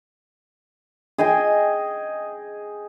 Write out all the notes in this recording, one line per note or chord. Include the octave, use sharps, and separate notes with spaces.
G#4 D#5 G5 G#5